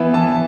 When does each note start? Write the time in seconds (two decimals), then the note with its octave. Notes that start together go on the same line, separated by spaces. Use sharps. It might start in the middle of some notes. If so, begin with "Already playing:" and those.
Already playing: E3 B3 E4
0.13 E3 A5